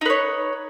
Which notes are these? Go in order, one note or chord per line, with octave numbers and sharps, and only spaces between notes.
D#4 B4 C#5